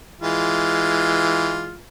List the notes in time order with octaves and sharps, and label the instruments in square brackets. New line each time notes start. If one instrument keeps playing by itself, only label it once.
[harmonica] E3 G#3 F4